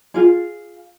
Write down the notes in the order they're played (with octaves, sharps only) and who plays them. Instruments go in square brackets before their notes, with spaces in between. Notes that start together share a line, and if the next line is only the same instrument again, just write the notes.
[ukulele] F4 G#4